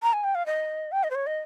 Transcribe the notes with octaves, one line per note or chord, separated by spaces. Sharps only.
A#5
G#5
G5
F5
D#5
G5
D#5
C5
C#5
D#5